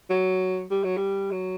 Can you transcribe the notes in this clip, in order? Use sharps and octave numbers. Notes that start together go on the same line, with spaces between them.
F#3
G3
F#3
G3
F#3